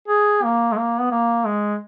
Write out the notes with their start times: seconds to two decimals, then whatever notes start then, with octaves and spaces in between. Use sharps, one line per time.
0.08 G#4
0.43 A#3
0.72 G#3
0.77 A#3
1.00 B3
1.11 A#3
1.45 G#3